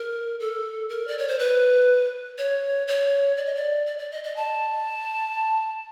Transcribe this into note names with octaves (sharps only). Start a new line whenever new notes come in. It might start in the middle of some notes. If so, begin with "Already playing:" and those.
Already playing: A#4
A4
A#4
D5
C#5
C5
B4
C#5
C#5
D5
D#5
D5
D5
D5
D#5
D#5
A5